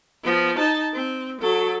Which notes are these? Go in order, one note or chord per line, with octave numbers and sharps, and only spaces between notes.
F3 B3
D#4 A5
C4
F#3 A4